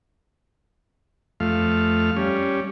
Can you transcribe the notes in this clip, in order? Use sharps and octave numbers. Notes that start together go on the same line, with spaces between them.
F2 A3 F5
G3 C#4